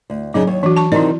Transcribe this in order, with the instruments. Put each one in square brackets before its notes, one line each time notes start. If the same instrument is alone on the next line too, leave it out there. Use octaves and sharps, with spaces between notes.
[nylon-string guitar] D2
[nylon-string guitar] F#2 C#3 D#4 [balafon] F#3
[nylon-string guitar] D#2 C#5
[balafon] E3 F#4 [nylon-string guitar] D4
[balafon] A5 C#6
[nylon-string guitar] C3 D#3 D#4 [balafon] E4 D5